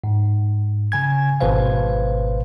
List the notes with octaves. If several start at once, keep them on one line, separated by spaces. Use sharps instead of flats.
G#2
C#3 G#5 G#6
G#1 B2 B4 C5 F5